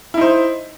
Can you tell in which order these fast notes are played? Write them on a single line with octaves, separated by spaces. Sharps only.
E4 D#4 C5